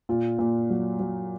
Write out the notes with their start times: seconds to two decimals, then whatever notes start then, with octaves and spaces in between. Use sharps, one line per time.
0.09 A#2 F4
0.39 A#2
0.70 F#3
0.99 F#3